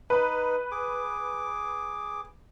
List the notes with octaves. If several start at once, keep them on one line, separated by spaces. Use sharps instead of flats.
D#4 B4
G#4 D6